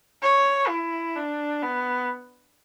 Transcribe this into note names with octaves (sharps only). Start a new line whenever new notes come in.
C#5
E4
D4
B3